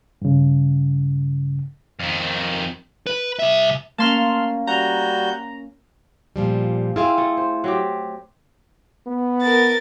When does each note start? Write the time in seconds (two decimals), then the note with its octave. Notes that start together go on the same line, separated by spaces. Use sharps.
0.22 G2 C#3
1.99 F2 D#3
3.07 B4
3.39 C2 E5
3.98 A#3 C#4 A5 C6 F6
4.67 G3 F#4 A#5 G6
6.36 A#2 F3 G3
6.96 C4 E4 F4 G#4 F5
7.18 A3
7.37 C5
7.64 F#3 C4 G4
9.07 B3
9.41 A#4 A6